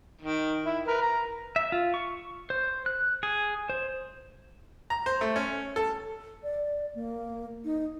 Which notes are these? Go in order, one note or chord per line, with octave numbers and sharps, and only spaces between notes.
D#3
E4
A#4 B4
A#5
E5
F4
C#6
C5
F#6
G#4
C5
A#5
C5
A3
C#4
A4
D5
A#3
D#4